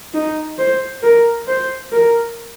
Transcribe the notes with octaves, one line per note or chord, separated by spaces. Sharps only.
D#4
C5
A#4
C5
A#4